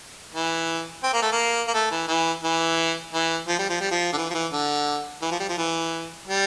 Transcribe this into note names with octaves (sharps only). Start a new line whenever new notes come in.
E3
C4
A#3
A3
A#3
A#3
A3
E3
E3
E3
E3
F3
G3
F3
G3
F3
D3
E3
F3
E3
D3
E3
F3
G3
F3
E3
G3